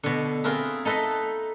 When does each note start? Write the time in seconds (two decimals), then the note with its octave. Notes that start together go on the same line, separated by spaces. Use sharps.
0.03 B2 D3
0.44 C4 F4 G#4 A#4 B4 E5
0.85 D#4 A4 B4 D#5 E5